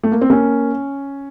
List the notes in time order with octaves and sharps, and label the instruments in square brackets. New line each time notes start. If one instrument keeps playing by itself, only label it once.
[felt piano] A3
A#3
C4
[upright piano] A#3 [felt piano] C#4